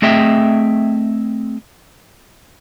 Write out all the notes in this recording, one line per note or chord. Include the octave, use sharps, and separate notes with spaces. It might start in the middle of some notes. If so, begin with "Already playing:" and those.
A3 C4 G#4 D#5 E5 G5